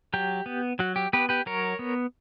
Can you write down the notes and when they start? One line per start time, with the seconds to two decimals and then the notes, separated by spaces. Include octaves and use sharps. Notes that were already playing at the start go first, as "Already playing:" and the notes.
0.14 F#3 G4
0.46 B3
0.79 F#3 F#4
0.96 G4
1.13 B3 G4 B4
1.29 G4 B4
1.46 F#3 A#4 C#5
1.79 B3